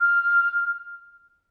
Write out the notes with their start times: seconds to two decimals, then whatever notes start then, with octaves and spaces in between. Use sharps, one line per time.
0.01 F6